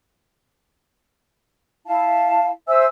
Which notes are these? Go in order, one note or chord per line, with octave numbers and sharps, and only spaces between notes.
E4 F5 A5
C5 E5 G#5 E6